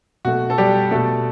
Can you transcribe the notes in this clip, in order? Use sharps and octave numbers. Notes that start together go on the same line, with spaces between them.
B2 A3 F#4
A4
G3 G4
B2 G3 A3 A4